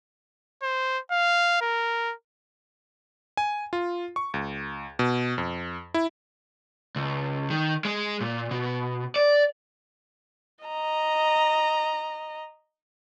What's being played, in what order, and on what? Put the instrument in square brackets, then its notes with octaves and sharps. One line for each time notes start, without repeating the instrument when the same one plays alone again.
[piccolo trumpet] C5
F5
A#4
[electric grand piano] G#5
F4
C#6
C#2
B2
F2
E4
[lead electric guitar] C#2
D#3
G#3
A#2
B2
D5
[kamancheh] D#5 A#5